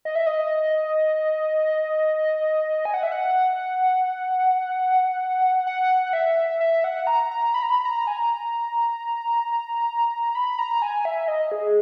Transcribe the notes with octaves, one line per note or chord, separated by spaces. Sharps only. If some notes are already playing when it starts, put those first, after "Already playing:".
D#5
E5
D#5
G#5
F#5
E5
F#5
F#5
F#5
E5
E5
F#5
A#5
A#5
B5
A#5
B5
A#5
G#5
A#5
B5
A#5
G#5
E5
D#5
G#4